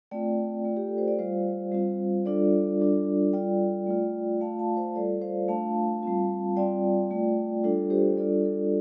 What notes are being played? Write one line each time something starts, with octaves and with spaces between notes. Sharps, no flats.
A3 C4 F4 D5 G5
A3 F4
G4
A4
C5
D5
G3 F4 C5 F5
G3 C4 F4
G3 D4 F4 A4 D5
G3 D4 F4
G3 F4 D5 G5
A3 F4
A3 F4 F5 A5
F5 A5
C5 F5
G3 F4 A4 D5
C5 F5
A3 D4 F4 F5 A5
G3 C4 F4
G3 C4 F4 D5 G5
A3 F4
G3 D4 F4 A4
G4 C5
G3 D4 F4 A4 D5
A4